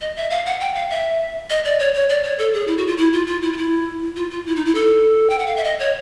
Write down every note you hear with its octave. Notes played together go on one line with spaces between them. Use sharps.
D#5
E5
F5
F#5
G5
F5
E5
D#5
D5
C#5
C#5
D5
C#5
A4
G#4
E4
F#4
F4
E4
F4
F4
E4
F4
E4
F4
F4
E4
D#4
E4
A4
G5
F#5
F5
E5
D#5
C#5